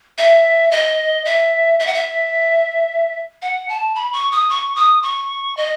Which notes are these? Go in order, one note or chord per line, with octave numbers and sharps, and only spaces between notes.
E5
D#5
E5
E5
F#5
E5
F#5
A5
B5
C#6
D#6
C#6
D#6
C#6
D#5